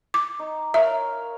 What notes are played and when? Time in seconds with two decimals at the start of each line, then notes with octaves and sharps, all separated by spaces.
0.14 D6
0.39 D#4
0.74 A#4 C#5 E5 F5